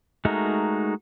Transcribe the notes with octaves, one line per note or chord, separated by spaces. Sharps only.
G#3 A3 D#4 F#4 A#4